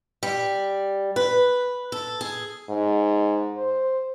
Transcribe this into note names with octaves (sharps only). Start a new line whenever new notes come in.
G3
B4
A4
G#4
G#2
C5